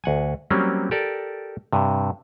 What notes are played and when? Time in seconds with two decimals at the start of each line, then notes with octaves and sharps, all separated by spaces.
0.04 D2 F#5 G#5
0.50 F#3 G3 A#3 C4 C#4
0.91 G4 A4 A#4 D5
1.73 G2 C3